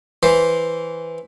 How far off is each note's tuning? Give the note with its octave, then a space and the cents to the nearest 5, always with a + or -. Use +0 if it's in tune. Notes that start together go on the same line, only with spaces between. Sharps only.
E3 +0 C5 +0